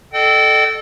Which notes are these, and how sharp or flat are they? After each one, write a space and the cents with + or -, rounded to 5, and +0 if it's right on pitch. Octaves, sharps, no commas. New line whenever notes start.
A4 -10 D#5 -40 G5 -30